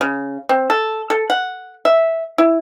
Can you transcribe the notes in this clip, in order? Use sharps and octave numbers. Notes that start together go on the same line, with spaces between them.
C#3
C4
A4
A4
F#5
E5
E4